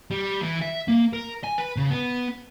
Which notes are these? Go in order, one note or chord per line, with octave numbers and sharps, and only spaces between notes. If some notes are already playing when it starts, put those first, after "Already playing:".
G3
E3
E5
A#3
A#4
G#5
B4
C#3
B3